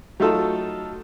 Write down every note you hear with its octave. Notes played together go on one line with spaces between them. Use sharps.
F#3 A3 D#4 F4 A4